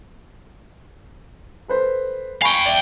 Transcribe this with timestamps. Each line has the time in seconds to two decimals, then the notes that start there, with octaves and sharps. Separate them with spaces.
1.68 A4 B4 C5
2.42 F5 G5 G#5 B5 C#6
2.66 D5 E5